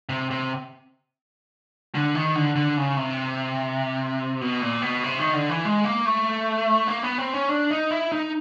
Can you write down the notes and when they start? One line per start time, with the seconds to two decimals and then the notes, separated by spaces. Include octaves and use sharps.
0.09 C3
0.30 C3
1.95 D3
2.15 D#3
2.35 D3
2.56 D3
2.77 C#3
2.97 C3
4.41 B2
4.62 A#2
4.82 B2
5.03 C3
5.19 D#3
5.33 D3
5.49 E3
5.65 G#3
5.85 A#3
6.06 A3
6.88 A#3
7.03 B3
7.18 C4
7.34 C#4
7.49 D4
7.71 D#4
7.91 E4
8.12 D#4